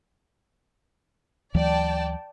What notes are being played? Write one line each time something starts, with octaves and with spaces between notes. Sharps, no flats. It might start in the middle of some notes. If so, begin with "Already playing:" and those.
D2 E3 F#3 D5 G5 A5